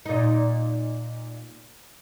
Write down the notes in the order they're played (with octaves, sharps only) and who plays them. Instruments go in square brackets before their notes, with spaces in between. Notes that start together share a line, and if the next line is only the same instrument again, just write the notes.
[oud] A#2 D#4